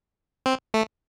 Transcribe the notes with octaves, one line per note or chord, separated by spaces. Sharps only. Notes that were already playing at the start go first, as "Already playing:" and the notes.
C4
A3